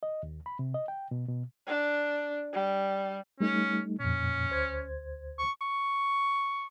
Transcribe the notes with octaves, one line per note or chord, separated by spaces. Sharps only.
D#5
D#2
B5
C3
D#5
G5
B2
B2
D4
G3
G3 A3 C#4 D#4
F2 A#2 C#4
D2 C5 G#6
C#6
C#6